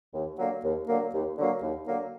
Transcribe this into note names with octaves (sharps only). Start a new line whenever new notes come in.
D#2
D3 F#3 A#3
D#2
D3 F#3 A#3
D#2
D3 F#3 A#3
D#2
D3 F#3 A#3